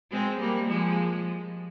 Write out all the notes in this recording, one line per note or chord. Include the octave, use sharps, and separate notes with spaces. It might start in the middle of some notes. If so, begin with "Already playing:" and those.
G#3 C4
G3 A#3
F3 G#3